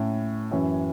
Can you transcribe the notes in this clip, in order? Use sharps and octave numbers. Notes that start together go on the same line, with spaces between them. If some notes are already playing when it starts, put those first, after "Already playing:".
Already playing: A2 A3 C#4
F#2 E3 C#4